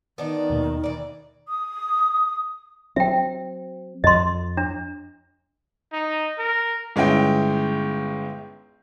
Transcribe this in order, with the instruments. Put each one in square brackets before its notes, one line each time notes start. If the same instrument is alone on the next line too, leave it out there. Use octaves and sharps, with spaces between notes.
[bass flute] D#3 [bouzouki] B3 D4 D#4
[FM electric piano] D#2 B2 A#3
[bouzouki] E3 D5
[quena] D#6
[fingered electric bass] F#3 C4 [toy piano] E5 G5
[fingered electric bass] F2 [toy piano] D#5 C6
[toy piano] D4
[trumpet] D#4
A#4
[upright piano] G1 G#3 C#4 E4 G5